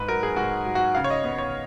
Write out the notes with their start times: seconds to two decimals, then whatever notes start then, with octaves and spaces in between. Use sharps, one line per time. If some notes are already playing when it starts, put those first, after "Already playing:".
Already playing: G#2 B4
0.08 F#3 A#4
0.23 G#4
0.36 G#2 F#4
0.66 F#3
0.75 F#4
0.95 C#3 F5
1.04 C#5
1.10 D#5
1.24 B3
1.38 C#5